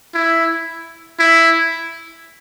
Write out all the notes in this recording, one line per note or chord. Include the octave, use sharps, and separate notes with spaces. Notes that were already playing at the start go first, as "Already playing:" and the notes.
E4
E4